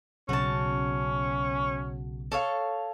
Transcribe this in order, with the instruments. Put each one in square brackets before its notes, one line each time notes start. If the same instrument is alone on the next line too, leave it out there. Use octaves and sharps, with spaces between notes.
[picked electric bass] B1 C#3 [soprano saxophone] C#4 [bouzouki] F#4 A5
[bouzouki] A4 C#5 F5